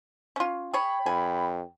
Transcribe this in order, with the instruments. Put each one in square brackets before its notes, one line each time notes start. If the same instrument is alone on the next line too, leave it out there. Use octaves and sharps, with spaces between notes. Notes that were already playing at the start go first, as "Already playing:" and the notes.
[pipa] C#4 F4
[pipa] G#4 C#5 [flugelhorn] G5 [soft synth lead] B5
[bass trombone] F2 [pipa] G#5